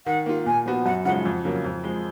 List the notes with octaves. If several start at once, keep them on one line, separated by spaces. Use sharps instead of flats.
D#3 F#5
A#3 F4
A#2 G#5
F3 B3 F#4
F#2 F#5
C#3 F3 G#3 F#5
F2
C#3 F#3 A#3
F2
F3 G#3